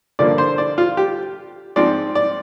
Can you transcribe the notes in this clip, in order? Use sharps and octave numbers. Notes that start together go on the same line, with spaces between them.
G2 D3 F3 A#3 D5
C5
D5
F4
G4
G#2 F3 C4 D5
D5